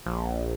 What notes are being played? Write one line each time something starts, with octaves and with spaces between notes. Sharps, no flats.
A#1